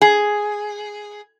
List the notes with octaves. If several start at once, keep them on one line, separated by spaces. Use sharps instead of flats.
G#4